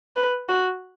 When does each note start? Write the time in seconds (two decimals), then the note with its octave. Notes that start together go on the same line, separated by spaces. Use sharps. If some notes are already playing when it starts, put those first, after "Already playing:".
0.17 B4
0.49 F#4